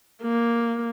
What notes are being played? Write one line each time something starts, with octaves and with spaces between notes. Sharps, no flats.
A#3